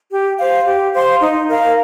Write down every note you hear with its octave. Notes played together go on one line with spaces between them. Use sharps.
G4
C5 F5
G4
C5 F5 C6
D#4
A#4 F5